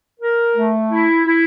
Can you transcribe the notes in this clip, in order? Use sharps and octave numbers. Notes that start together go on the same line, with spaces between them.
A#4
A3
E4
E4